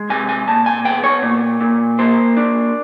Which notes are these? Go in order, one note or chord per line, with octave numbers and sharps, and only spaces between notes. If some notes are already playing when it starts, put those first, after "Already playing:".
Already playing: G#3
C3 G#5
G#5
A#2 A5
G#5
B3 G5
C#5
A#2
A#2
A#3 C5
D4